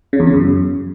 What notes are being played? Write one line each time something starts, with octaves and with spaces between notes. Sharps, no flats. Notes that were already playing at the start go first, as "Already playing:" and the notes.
C#3
E2
C#3
F#2